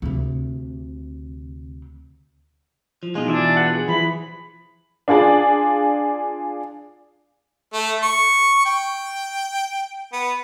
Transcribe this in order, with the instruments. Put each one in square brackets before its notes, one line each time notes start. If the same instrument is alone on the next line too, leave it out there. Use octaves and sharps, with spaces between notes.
[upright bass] D2 C3
[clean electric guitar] F3
[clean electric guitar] B2 F4 [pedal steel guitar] G#3 D#4
[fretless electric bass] E3 [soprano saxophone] D4 [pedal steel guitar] D5 E5 G#5
[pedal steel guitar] G4 B4 F#5
G#4
[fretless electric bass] E3 [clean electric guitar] F3 [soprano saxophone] B5
[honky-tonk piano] D4 F4 G#4 D5
[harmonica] A3
C#6
G5
B3